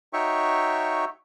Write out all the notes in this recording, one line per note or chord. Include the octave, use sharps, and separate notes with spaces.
D#4 F#4 C#5 E5 G5 C#6